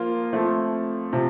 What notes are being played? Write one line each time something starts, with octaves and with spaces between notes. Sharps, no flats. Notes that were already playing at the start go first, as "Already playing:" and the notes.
Already playing: F3 A#3 F4
F3 A3 C4
C3 F3